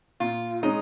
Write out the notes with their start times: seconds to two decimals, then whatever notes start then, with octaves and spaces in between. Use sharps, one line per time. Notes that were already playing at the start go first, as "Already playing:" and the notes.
0.20 A#2 F4
0.63 G#3 C#4 D#4